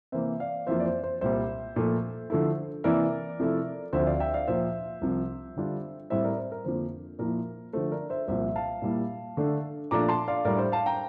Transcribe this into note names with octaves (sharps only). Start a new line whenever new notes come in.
C3 E3 A#3 C5 E5
D5 F5
F2 E3 A#3 F4 C5 E5
D5
C5
C5
C2 A#2 G3 C5 E5
A#2 F3 A3
D3 F3 A3 E4
C3 E3 A#3 E4 A#4 D5
C3 F3 A3 E4
D2 D3 F3 C4 C5 E5
D5 F5
E5 G5
D5 F5
A#2 F3 A#3 C5 E5
C2 C3 F3
D3 G3 D4 F4
A2 G3 C4 E4 C5 E5
A#4 D5
C5
A#4
F2 D3 F3 A#3 C5
A#2 F3 A#3 E4 A#4
D3 F3 A3 C5
A#4 D5
C5 E5
C2 A#2 F3 C5 E5
F5 A5
A#2 G3 A#3 E4
D3 A3 D4
A#2 F3 A3 D4 F4 A#5 D6
A5 C6
D5 F5
A2 G3 D4 A#4 D5
C5
F5 A5
G5 A#5